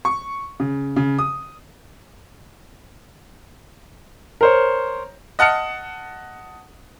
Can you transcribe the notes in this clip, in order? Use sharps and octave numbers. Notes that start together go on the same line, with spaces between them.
C#6
C#3
C#3
D#6
A#4 C5 C#5
D#5 F#5 A5 F6 C#7